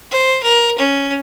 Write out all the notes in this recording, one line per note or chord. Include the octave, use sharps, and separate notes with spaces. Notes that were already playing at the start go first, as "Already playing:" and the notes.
C5
A#4
C#4